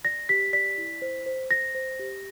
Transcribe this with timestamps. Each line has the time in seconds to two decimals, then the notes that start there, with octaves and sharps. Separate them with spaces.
0.05 D5 A#6
0.29 G4 B6
0.53 D5 B6
0.78 E4
1.02 C5
1.26 C5
1.50 C5 A#6
1.75 C5
1.99 G4